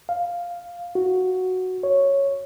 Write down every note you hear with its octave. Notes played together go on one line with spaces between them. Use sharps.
F5
F#4
C#5